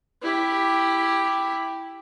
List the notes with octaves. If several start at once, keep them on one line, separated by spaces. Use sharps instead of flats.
E4 G4